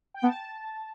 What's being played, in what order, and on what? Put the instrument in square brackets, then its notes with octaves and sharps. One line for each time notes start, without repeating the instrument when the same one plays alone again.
[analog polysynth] G5
[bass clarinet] B3 [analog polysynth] A5